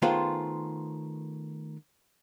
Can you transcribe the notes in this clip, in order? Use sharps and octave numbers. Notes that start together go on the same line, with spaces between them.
D#3 A3 B3 F4 G#4 C5